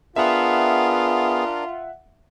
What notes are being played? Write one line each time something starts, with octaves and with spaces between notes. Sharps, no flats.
B3 D4 F4 G#4 A#4 E5 F#5